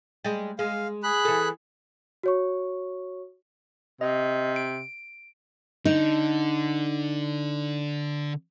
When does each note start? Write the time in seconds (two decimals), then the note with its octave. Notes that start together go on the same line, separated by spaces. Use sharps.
0.24 G3 G#3
0.59 G#3 F5
1.03 G#4 B5 F#6
1.25 E3 A4
2.23 F#4 C#5 C#6
4.01 C3 D#5
4.56 D7
5.85 D3 D#4